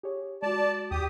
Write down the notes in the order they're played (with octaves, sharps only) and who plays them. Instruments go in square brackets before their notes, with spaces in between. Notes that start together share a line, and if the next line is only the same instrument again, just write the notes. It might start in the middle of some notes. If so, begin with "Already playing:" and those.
[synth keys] G4 G#4 C#5
[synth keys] G#3 F#4 [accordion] D5 A5
[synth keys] D#2 [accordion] G4 D#6